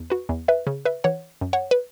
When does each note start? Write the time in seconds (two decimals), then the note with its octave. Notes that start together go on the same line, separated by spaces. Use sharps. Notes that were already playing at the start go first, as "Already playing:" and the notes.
Already playing: E2
0.10 F#4 B4
0.29 E2
0.48 B4 E5
0.67 C#3
0.85 B4 E5
1.04 E3 C#5 F#5
1.41 F#2
1.53 C#5 F#5
1.71 B4